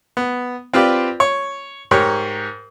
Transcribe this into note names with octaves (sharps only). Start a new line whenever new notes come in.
B3
C4 F4 G4 B4 D5
C#5
G#2 G4 A#4 C#5